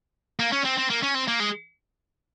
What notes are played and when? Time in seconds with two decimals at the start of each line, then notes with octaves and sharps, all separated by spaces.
0.40 A#3
0.52 C#4
0.65 C4
0.77 C4
0.90 A#3
1.02 C#4
1.14 C4
1.28 A#3
1.40 G#3